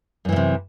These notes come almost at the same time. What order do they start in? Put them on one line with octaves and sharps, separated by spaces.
F#2 E3 A2 C3